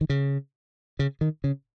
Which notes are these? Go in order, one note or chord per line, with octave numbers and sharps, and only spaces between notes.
D#3
C#3
C#3
D#3
C#3